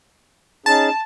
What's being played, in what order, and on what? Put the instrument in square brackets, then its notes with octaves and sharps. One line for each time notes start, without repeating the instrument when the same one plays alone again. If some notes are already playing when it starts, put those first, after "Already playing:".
[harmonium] C#4 D#4 G#4 [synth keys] A5